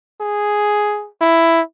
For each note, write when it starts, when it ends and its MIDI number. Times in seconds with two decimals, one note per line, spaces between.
0.21 1.08 68
1.21 1.61 64